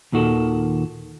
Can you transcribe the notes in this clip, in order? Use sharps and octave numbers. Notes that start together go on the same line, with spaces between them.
D#2 A#2 D#3 F#4 A4